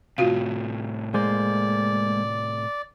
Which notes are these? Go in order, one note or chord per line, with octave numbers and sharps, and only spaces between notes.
A2 C3 F4 F#4 F5
G#3 A#3 C5 D5